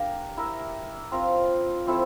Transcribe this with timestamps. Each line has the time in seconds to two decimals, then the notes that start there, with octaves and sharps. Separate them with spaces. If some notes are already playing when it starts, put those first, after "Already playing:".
Already playing: D4 G4 A#4 F5
0.37 E4 A#4 E5
1.11 C4 F4 A#4 F5
1.87 F3 C4 E4 A4